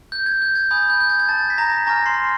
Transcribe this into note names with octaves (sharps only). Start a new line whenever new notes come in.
G6
G#6
G6
G#6
G#5 B5 D#6 G6
G6
G6
G#6
G#6
A5 A6
B6
A#5 A#6
G#5 A#5 C#6 F6 A#6
C6 C7